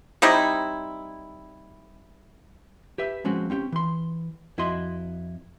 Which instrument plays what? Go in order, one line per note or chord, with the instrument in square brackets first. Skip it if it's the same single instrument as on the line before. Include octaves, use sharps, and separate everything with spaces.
[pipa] G3 C4 D#4 E4
[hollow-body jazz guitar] G4 B4 E5
F3 G#3 C4 C#4 F#4
C4 C#4 F4 G4
E3 C6
F2 E4 F#4 D#5 C6